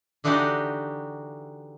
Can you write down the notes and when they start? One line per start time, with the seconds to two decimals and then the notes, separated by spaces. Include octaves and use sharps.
0.24 D3 E3 D4 D#4 F#4 G4